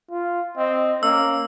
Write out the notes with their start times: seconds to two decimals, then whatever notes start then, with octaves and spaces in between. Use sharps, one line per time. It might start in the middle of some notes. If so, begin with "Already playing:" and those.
0.11 F4
0.57 C4 D#5
1.03 A#3 C#4 E6